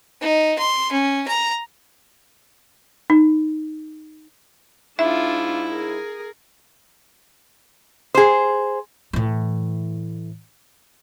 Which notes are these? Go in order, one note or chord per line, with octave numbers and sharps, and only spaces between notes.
D#4
C6
C#4
A#5
D#4
G#2 D4 E4 F4 E5
G#4 A#4
G#4 C5
A2 E3